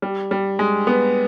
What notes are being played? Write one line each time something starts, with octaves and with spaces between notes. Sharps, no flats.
G3
G3
G#3
B3